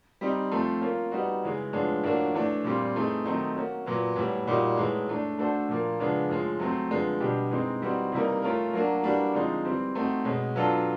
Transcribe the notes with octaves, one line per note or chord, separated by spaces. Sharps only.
G3 C4 D#4
F3 A3 C4
A#3 C#4 F4
G3 B3 D#4 F#4
C#3 E3 G#3
A2 F3 G#3 B3 D4
A2 F3 A#3 D4 F#4
E3 A3 D4
A#2 G3 C4 F4
E3 A3 C4 D#4 G#4
D#3 F#3 A3 C4 D#4
A#3 C#4 F#4
A#2 F#3 B3
A2 E3 G3 B3
A#2 G3 A#3 D#4 F#4
A2 E3 G#3 B3 D#4
E3 A3 D4
A3 D4 F#4 A4 C5
A#2 F3 A#3
C#3 F3 G#3 B3 D4
A2 F3 G#3
F#3 A3 C4
D3 F3 G#3 B3
B2 G3 B3 D4 G4
E3 G#3 C4 D#4
E3 G3 C4 D#4 F#4
C3 E3 G3 A#3 D#4
A3 C#4 F4 A#4
F#3 A#3 D4 F#4
E3 G3 A#3 D4 F#4
D3 F3 G#3 C4 D#4
E3 G3 C4
A3 C4 D#4 F#4
B2 G#3 C#4
F#3 B3 D4 F4 A4